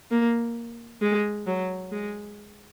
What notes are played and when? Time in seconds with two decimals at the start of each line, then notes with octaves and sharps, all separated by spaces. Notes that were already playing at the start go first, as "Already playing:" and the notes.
0.11 A#3
1.01 G#3
1.46 F#3
1.92 G#3